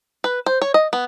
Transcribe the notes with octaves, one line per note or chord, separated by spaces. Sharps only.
B4
C5
C#5
D#5
B3